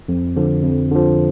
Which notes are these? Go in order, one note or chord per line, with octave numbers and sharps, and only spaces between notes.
F2
D3 F3
F2
D3 F3